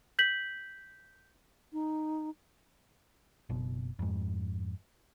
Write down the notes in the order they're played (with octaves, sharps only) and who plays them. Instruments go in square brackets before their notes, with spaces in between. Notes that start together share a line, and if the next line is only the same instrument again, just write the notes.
[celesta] G6 B6 F#7
[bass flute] D#4
[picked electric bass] F#1 B2
F2 G#2